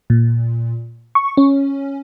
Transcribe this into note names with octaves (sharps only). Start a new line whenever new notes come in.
A#2
C#6
C#4